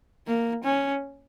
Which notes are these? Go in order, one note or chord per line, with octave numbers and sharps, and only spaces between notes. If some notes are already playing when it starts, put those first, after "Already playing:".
A#3
C#4